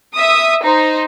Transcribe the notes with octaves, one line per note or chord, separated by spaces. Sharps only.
E5 D#6
D#4 C5